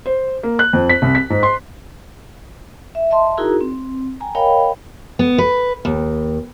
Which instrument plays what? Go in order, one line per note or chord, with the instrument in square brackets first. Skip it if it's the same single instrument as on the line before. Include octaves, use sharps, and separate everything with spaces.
[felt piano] C5
A#3
F#6
F2
B6
C2
B6
G#2
C6
[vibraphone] E5
D#5 E5 A5 C6
D#4 E4 F#4 G#4 A#4 A#5
C4
G5 G#5 A#5
A#4 C#5 D#5 F5 G5 B5
[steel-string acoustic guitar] B3
B4
D#2